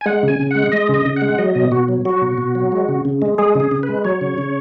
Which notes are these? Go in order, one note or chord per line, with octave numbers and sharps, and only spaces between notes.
G#5
G#3 F#5
C#3 G#5
C#3
G#3 F#5
G#3 D#5
C#3
D#5
C#3
F#5
G#3
F#5
F#3 D#5
B2 D#5
B2 F#4
F#3
F#3 F#4
B2
B2
F#3
G#3
C#3
C#3
G#3
G#3 G#4
C#3
G#4
C#3
B4
G#3
F#3 C#5
C#3
C#3